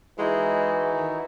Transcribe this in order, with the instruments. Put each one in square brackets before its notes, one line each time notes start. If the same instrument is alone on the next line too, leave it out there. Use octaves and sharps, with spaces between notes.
[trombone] E3 [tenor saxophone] G#3 [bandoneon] D#4 E4 F#4
[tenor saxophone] D#3